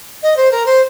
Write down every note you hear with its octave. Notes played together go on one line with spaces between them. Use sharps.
D#5
C5
A#4
C5